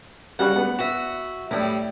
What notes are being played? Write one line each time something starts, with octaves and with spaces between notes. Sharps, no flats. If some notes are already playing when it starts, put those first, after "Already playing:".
C#3 G3 F#4 F#5
B3
F#4 E5
A2 G3 E4